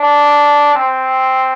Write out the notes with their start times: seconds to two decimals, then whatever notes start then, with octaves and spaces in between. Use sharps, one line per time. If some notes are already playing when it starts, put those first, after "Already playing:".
Already playing: D4
0.75 C4